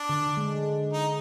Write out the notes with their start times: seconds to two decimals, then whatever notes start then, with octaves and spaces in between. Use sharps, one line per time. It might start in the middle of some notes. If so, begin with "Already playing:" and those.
Already playing: D4
0.09 D3
0.37 G#3
0.93 D#4